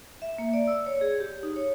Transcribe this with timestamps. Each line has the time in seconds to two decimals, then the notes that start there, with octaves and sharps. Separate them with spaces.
0.22 E5
0.38 A#3
0.53 D5
0.67 E6
0.86 C#5
1.01 G#4
1.20 G4
1.43 D#4
1.56 C#5